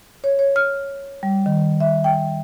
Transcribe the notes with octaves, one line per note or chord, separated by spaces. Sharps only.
C#5
C#5
F6
G3
D#3
E5
G5